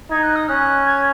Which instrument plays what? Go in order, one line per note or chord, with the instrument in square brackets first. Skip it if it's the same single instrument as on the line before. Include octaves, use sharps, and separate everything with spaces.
[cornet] D#4 [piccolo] G#6
[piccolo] F#6
D#6
[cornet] C#4 [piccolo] F#6
[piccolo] G#6